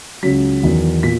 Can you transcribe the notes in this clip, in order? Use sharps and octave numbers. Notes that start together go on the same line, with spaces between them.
C#2 C#3 F#3 B6
E2 D#3 F#3
A#2 B6